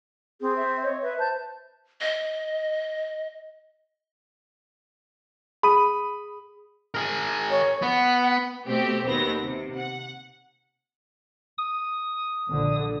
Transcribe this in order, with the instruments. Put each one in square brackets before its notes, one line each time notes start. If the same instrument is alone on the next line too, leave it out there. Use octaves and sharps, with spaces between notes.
[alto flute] C4 [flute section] G#4
[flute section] E5
C#5 D#5
[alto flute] B4 [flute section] E5
[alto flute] C5 [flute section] A5 G6
[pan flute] D#5
[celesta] G#4 D#6 D#7 [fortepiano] B5
[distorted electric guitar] G#4 A#4
[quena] C#5
[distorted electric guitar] B3 [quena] F#5
[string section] B2 A3 C4 G4
D#2 B2 B3 C4 A#6
C3
F#5
[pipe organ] D#6
[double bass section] A#1 D3